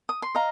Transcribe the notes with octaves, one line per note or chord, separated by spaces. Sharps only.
D#6
C6
D#5 F5 A#5